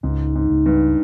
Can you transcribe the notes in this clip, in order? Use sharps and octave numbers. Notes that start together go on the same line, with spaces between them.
C#2 G#2
G#2
C#2
G2